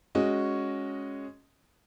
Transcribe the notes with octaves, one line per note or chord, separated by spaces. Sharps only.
G#3 C#4 F#4 D#5